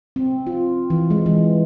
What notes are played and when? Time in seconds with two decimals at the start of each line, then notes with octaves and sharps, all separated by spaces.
0.16 C4
0.47 F4
0.90 E3
1.10 G#3
1.26 E3